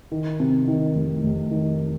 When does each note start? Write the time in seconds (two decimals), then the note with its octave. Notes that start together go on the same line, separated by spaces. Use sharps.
0.12 D#3
0.40 C3
0.68 D#3
0.95 F1
1.23 F1
1.51 D#3